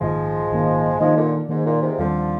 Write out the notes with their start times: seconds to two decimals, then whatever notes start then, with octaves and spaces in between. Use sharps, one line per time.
0.01 A#1 G#2 D#3 F3 G#3 A#3
0.50 A#1 G#2 D#3 A#3
1.00 D#3 F3 G#3 A#3 D#4
1.16 A#2 D3
1.49 G#2 D#3 A#3 D#4
1.66 A#2
1.82 G#2 C3
1.98 D#2 D3 D#3 F3 G3 C4